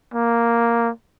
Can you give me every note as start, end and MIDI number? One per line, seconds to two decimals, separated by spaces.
0.14 0.90 58